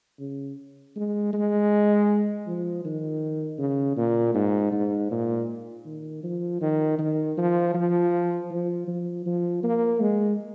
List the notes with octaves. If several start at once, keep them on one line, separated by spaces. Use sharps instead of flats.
C#3
G#3
G#3
F3
D#3
C#3
A#2
G#2
G#2
A#2
D#3
F3
D#3
D#3
F3
F3
F3
F3
F3
A#3
G#3